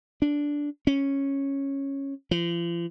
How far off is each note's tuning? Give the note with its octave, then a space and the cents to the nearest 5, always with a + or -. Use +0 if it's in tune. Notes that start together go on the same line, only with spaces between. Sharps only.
D4 -10
C#4 -10
F3 -40